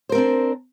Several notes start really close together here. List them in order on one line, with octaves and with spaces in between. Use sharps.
C5 A#4 C4 D4